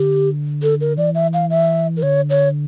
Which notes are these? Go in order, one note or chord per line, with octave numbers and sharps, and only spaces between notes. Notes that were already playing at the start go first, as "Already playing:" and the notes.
Already playing: D3 G4
A4
A#4
E3 D5
E5
F5
E5
A#4
D3 C#5
C#5